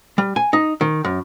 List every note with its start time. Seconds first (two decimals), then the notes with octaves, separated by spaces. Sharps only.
0.18 G3
0.36 G#5
0.53 D#4
0.81 D#3
1.04 F#2